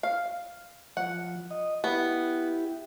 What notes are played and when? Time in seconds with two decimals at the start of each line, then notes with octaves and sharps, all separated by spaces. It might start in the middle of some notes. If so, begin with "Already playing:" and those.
0.03 F5
0.97 F3 F#5
1.51 D#5
1.84 B3 E4 G4